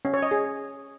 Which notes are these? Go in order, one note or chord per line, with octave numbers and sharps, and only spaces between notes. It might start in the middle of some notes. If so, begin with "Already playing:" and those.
C#4
C#5
D#5
G#4